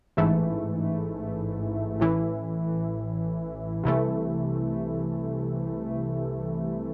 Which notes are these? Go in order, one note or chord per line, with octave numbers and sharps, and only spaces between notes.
A1 G#2 E3 A3
A1 A2 E3
C2 C3 E3 A3